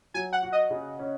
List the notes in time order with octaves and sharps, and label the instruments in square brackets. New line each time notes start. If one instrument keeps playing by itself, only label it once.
[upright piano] F#3 [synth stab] G#5
[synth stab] F#5
[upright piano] F#4
[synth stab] D#5
[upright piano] C#3
C#4